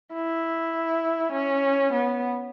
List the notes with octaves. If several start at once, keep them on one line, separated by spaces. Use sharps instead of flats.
E4
C#4
B3